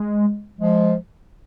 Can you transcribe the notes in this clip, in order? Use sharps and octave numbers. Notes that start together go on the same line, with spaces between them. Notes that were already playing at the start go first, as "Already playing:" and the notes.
Already playing: G#3
F3 G#3